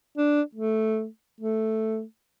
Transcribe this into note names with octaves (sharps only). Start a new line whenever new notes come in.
D4
A3
A3